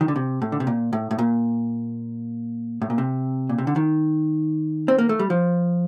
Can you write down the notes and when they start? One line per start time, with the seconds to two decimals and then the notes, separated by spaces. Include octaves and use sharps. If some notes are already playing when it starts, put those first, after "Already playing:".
0.01 D#3
0.08 D3
0.16 C3
0.42 A2
0.52 D3
0.60 C3
0.67 A#2
0.93 A2
1.11 A2
1.19 A#2
2.82 A2
2.90 A#2
2.98 C3
3.49 A#2
3.58 C3
3.67 D3
3.76 D#3
4.88 C4
4.98 A#3
5.09 A3
5.19 G3
5.30 F3